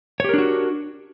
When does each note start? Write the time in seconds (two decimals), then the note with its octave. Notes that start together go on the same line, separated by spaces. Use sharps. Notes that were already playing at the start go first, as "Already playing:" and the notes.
0.20 C#5
0.24 G4
0.29 A#4
0.34 D4
0.38 F#4